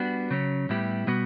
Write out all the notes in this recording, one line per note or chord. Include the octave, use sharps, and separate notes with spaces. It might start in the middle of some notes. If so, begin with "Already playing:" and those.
Already playing: G3 B3 D4 F#4
C#3 F#3 C#4
A2 G3 B3 E4 G4
B2 G3 B3 F#4